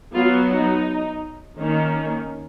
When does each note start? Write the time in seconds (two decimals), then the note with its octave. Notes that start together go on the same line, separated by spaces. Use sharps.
0.14 F#3 B3 F4
0.50 D#4
1.57 D#3 A#3 C#4